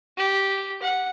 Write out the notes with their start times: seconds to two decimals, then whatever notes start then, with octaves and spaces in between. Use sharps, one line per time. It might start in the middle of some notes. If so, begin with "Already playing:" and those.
0.17 G4
0.82 F#5